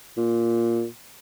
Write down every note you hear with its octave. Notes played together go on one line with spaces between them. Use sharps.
A#2